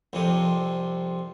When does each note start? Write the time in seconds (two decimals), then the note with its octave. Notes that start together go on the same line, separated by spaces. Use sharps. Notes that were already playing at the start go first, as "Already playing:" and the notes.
0.13 C2 F2 C3